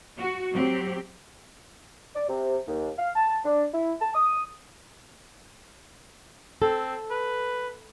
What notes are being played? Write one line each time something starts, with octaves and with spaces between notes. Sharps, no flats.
F#4
F#3 C4 G4
D5
C3
D#2
F5
A5
D4
E4
A5
D#6
C4 A4
B4